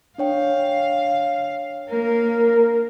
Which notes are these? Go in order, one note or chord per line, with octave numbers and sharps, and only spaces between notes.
D4 C#5 F5 G5
A#3 A#4